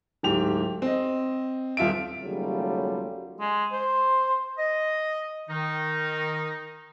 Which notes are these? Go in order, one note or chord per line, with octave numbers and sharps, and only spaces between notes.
D1 G#2 G4 F7
C4 D#5
D#1 F4 E5 D7
D#2 C#3 F#3 G3 A3 F4
G#3
C5
D#5
D#3 D#4